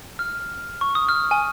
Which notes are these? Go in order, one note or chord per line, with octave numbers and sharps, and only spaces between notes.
F6
C#6
D#6
F6
G#5